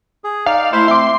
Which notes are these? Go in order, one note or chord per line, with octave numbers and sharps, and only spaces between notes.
G#4
D#4 D5 F5
A3 E4 C5 F5 C6
C4 E5 C6 D6